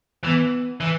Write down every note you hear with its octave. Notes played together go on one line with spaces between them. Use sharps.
E3 B3
E3